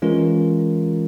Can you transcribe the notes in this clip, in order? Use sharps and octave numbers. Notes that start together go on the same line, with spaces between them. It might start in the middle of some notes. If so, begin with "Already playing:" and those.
E3 G#3 C#4 F4 A#4